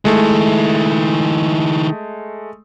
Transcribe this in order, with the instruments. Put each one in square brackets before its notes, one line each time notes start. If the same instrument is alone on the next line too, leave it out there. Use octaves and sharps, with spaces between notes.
[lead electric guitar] D#3 E4 [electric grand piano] G#3 A3